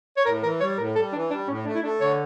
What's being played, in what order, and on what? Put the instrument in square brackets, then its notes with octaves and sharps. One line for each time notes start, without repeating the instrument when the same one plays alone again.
[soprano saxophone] C#5
[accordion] A2 [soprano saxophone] A#4
[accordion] E3 [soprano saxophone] A#4
[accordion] G3 [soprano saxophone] C#5
[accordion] A2 [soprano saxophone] A#4
[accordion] G3 [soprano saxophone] A4
[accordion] E3 [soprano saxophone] D4
[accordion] G3 [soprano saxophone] D4
[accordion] A2 [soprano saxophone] C#4
[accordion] A3 [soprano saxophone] D4
[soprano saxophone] E4
[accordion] A3 [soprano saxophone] D4
[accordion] D3 [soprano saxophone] C#5